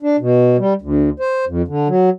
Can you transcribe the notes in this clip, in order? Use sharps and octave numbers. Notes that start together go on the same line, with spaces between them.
D4
B2
G3
D2
C5
F2
D3
F#3